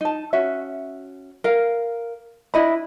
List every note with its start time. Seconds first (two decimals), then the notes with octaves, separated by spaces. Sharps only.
0.01 D#4 A5
0.33 C#4 F#4 E5
1.44 A#4 F5
2.54 D4 E4 D#5 B5